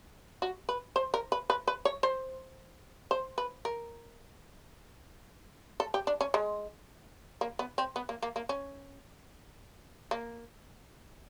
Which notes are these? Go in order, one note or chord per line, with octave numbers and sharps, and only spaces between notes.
F#4
B4
C5
A#4
B4
B4
B4
C#5
C5
C5
B4
A#4
A4
G4
D4
C#4
G#3
A#3
B3
C4
B3
A#3
A#3
A#3
C#4
A#3